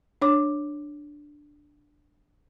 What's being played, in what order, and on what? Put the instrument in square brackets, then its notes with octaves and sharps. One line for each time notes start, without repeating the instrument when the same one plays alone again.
[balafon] D4 C#5 D6